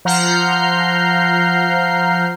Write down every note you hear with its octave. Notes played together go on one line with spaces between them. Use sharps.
F3 F#5 A#5 F6 G6 C7